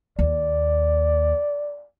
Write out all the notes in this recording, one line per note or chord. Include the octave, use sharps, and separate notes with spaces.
D#2 D5